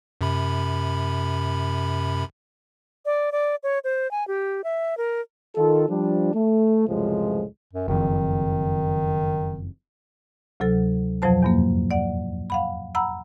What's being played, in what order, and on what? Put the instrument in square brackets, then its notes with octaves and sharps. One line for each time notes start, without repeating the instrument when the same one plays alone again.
[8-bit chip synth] F#2 C3 B5
[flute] D5
D5
C#5
C5
G#5
G4
E5
A#4
[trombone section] D#3 F4 A4
F3 G3 D4
A3
C#2 F#2 A2 C3 F3 G#3
[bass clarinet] F#2
[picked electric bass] F#1 F2 [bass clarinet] D#3
[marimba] D2 C3 F#3 A4
F2 B2 F3 F#3 C5 A5
E2 G2 A#3
D5 F#5
F5 F#5 B5
F#5 A#5 B5 E6